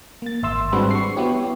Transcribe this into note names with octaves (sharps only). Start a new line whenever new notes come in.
A#3 A6
G#1 E5 C6 E6
G3 G#3 C4 D4 F#4 B4
C#6 C7
B3 E4 F#4 G4 C#5